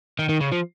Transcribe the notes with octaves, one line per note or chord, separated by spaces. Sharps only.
D#3
D#3
C#3
F3